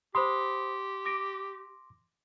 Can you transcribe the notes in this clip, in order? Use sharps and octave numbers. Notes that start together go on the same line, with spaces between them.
G4 C5 B5 C6 D#6
D6 A#6 D7